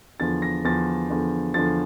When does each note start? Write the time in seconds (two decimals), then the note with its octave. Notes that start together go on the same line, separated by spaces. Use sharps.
0.20 E2 D3 F3 A6
0.42 A#6
0.64 E2 D3 F3 A6
1.10 E2 D3 F3
1.54 E2 D3 F3 A6